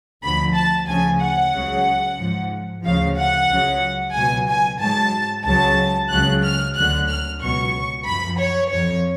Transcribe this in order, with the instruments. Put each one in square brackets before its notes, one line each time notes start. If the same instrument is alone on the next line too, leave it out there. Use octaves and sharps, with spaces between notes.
[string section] D2 D3 F3 B5
A5
D2 C#3 F3 G#5
F#5
C#2 C#3 F#3
G#2 F3
D2 C#3 F3 F5
F#5
C#2 C#3 F#3
C#2 B2 F#3 G#5
G#5
G#2 F#3 A5
C#2 C#3 F#3 A5
C#2 C#3 F#3 F#6
F6
D2 D3 F#3 F#6
F6
C#2 B2 F#3 C#6
F#2 F3 B5
C#5
F2 F3 C#5